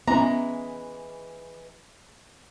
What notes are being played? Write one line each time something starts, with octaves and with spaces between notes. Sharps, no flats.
E3 G#3 B3 C#4 A#5